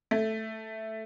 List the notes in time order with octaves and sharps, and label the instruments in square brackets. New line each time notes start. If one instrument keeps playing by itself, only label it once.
[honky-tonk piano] A3